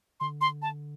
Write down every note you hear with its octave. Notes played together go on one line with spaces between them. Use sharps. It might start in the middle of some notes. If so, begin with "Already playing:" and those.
D3 C6
C6
A5